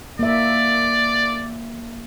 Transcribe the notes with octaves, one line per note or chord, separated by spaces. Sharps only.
A#3 D5 E5